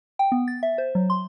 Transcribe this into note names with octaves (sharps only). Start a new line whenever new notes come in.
G5
B3
A6
E5
C5
F#3
C6